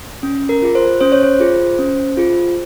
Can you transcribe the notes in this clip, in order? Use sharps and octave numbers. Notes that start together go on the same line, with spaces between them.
C#4
A#4
F4 G#4
C5
C#4 C5
C#5
C5
F4 G#4
C#4
F4 G#4